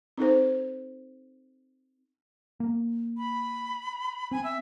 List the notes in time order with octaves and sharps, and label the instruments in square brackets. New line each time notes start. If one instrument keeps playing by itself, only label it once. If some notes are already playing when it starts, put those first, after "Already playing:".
[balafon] C4 D#4 A4 C5
[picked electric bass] A#3
[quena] B5
[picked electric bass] C4 [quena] G#5
[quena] E5